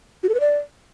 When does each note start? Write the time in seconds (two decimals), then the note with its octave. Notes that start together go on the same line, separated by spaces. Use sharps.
0.23 F#4
0.29 A4
0.34 B4
0.40 D5